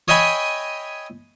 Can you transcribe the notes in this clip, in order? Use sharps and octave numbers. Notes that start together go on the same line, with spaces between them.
C#5 D#5 E5 G5 G#5 B5